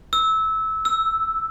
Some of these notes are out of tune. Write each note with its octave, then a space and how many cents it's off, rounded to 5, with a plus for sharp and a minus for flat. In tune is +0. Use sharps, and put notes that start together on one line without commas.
E6 -20
E6 +0